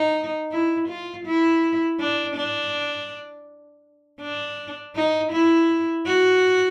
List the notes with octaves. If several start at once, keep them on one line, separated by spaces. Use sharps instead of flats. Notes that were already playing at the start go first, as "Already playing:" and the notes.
Already playing: D#4
E4
F4
E4
D4
D4
D4
D#4
E4
F#4